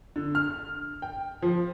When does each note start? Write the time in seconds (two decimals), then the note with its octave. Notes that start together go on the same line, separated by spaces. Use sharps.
0.16 D3
0.35 F6
1.02 G5
1.42 F3